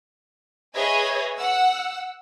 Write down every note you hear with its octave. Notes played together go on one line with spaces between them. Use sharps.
G#4 B4 C#5 D#5 E5 G#5
F#5 E6